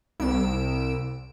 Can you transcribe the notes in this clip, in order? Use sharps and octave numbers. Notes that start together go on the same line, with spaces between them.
C2 E6 D7